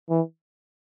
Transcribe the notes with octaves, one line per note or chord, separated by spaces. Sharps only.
E3